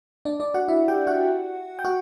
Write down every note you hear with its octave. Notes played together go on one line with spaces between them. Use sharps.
D4 D5
D4 D5
F#4 F#5
E4 E5
G4 G5
F#4 F#5
G5
F#4 F#5